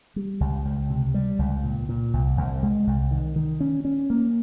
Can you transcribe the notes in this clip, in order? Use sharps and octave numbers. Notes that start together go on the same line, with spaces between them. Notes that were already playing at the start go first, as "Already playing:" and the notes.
G3
C#2
C#2
C3
G3
C#2
A#2
A#2
C2
C2
G#3
C2
D#3
D#3
C#4
C#4
A#3